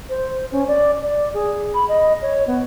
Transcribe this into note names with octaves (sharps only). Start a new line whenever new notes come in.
C5
C#4
D5
D5
G#4
B5
D#5
C#5
B3